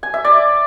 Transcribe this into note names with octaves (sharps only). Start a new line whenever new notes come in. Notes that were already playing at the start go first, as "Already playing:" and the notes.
G#5
E5
D5